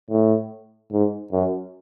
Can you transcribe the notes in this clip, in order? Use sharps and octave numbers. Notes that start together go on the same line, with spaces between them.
A2
G#2
F#2